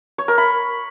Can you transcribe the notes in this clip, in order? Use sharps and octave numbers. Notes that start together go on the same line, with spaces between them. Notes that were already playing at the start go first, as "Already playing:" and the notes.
C#5
A#4
B5